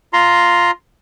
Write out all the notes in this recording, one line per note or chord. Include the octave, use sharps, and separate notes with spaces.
F4 A#5 C6